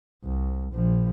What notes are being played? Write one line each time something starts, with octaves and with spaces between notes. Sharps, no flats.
C2
A#1 F3